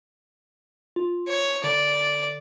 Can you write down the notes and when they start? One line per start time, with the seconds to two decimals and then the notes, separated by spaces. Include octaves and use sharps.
0.96 F4
1.28 C#5
1.64 D3 D5